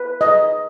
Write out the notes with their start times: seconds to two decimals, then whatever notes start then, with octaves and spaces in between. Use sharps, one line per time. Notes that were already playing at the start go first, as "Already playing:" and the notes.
Already playing: B4
0.21 D#5